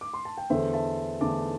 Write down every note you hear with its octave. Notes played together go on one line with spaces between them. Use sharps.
D6
C6
A5
G5
E2 D3 A3 C5 E5
E5 A5
E2 D3 A3 A5 D6